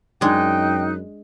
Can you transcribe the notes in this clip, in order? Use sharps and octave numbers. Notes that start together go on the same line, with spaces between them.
F#2 G#3 D4 D#4 G5 F#6